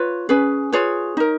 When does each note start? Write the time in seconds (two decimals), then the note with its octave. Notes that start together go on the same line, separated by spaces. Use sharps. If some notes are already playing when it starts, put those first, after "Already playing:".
Already playing: F4 B4 C#5
0.29 C#4 G#4 B4
0.72 F4 G#4 B4 C#5
1.17 D#4 A#4